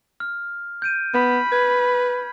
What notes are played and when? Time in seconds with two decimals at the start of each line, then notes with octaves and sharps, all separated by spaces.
0.20 F6
0.82 G6 D7 D#7
1.14 B3 B5
1.52 B4 G#6